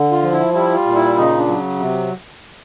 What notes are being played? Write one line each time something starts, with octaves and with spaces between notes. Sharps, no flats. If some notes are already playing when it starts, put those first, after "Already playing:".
Already playing: D3
F4
F3
E4
G3 E4
F4
A#2
E4
C#3 D#4
D4
F#3
C3